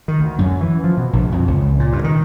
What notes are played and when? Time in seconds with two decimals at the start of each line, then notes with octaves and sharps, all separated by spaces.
0.08 D#3
0.20 D2
0.38 F#2
0.61 E3
0.84 F3
0.97 B2
1.13 A#1
1.32 F2
1.48 C#2
1.79 A#2
1.93 G2
2.04 D#3